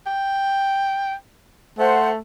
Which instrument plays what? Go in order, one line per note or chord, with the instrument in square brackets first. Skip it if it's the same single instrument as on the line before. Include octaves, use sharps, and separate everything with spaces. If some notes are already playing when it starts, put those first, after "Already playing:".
[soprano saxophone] G5
[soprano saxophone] A3 [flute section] C5 F#5